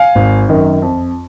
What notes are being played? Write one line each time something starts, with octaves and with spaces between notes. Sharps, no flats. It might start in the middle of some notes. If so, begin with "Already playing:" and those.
Already playing: F5 G#5
G#1
F#2 D#3
F2